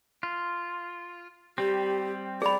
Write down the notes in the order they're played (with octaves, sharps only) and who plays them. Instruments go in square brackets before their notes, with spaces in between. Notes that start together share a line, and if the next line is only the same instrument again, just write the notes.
[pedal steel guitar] F4
[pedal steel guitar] G3 C4 [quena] G4
[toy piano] G#4 B5 [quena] D5